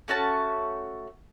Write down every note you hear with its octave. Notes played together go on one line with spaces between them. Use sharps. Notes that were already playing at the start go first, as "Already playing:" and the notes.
A3 C#4 F#4 A5